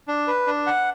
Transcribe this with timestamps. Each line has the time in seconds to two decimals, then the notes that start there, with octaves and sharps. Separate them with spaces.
0.08 D4
0.27 B4
0.47 D4
0.67 F#5